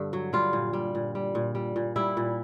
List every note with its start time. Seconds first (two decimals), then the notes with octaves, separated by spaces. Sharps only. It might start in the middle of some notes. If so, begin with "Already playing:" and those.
Already playing: G2 D3
0.13 F#3
0.33 G3 F4
0.53 A#2
0.73 G3
0.95 A#2
1.15 G3
1.35 A#2
1.55 G3
1.76 A#2
1.96 G3 E4
2.17 A#2